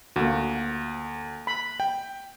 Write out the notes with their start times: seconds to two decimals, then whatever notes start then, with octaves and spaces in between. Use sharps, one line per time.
0.16 D2 A#3 F#4
1.47 B5
1.80 G5